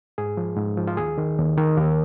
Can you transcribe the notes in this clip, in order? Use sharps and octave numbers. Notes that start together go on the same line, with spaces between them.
G#2 G#4
F3
G#2
F3
F4
D#2 G#4
D#3
D#2
D#3
D#2 A#4